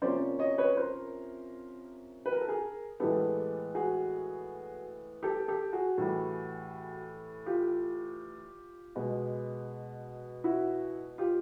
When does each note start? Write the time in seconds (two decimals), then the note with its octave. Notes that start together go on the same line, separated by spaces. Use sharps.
0.02 C3 F3 A#3 C#4 C5 D5
0.39 C#5 D#5
0.58 B4 C#5
0.77 A#4 C5
2.26 B4
2.33 A#4
2.41 A4
2.48 G#4 A#4
3.00 A2 E3 G#3 B3 G4 A4
3.75 F#4 G#4
5.23 G4 A4
5.48 G4 A4
5.73 F#4 G#4
5.98 A2 E3 G3
7.46 F4 G4
8.95 B2 G#3 B3
10.44 E4 F#4
11.18 F4 G4